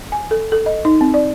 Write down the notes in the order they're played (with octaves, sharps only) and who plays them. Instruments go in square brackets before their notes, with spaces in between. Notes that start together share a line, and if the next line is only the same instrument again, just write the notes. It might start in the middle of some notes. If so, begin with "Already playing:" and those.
[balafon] G#5
A4
A4
D#5
D#4
C4
D5